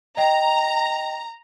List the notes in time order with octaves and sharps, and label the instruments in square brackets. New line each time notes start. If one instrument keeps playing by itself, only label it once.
[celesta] D#5 G5 [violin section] A#5